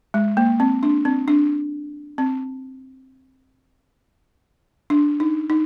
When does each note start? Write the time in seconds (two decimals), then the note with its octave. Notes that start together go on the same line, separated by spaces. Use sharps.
0.14 G#3
0.37 A#3
0.60 C4
0.83 D4
1.05 C4
1.28 D4
2.18 C4
4.90 D4
5.20 D#4
5.50 D#4